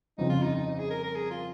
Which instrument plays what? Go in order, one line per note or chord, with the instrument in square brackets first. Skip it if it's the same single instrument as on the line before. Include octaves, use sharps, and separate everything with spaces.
[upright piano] G1 F2 C#3 F3 C4 [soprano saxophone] D#4
[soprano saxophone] F4
D#4
D#4
D#4
G#4
A#4
A#4
G#4
F4